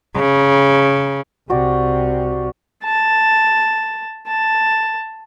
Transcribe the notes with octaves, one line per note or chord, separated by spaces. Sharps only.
C#3
C2 C3 F#4 D5 G5
A5
A5